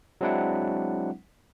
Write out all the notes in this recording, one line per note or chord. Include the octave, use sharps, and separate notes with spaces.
F#3 G#3 C4 D4 E4 F#5